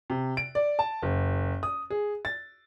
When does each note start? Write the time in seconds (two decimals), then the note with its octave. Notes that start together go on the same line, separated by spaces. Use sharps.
0.10 C3
0.37 D7
0.55 D5
0.79 A5
1.03 F#1
1.63 D#6
1.90 G#4
2.25 A6